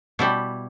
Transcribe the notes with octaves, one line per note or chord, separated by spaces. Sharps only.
B2 G3 E4